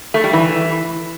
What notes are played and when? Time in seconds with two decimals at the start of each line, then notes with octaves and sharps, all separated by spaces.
0.14 A3
0.24 G3
0.33 E3